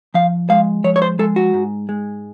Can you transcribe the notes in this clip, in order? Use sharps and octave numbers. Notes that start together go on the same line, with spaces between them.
F3 F5
G#3 F5
F3 C#5
C#5
C5
G#3 A4
F#4
G#2
G#3